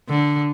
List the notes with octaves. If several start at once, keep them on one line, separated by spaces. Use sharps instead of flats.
D3